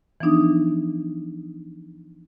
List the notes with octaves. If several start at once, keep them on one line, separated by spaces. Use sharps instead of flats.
E3 F3 B3 D4 D#4 D#6